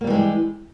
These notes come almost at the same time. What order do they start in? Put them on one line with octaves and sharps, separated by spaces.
A#3 G3 E3 G#3 G4